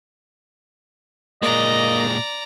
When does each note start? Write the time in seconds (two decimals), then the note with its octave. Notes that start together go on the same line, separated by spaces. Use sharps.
1.42 A#2 G#3 A#3 D5 D#5 A#5